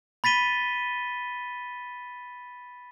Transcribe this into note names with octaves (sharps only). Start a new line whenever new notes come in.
B5 A6 B6 D#7 G7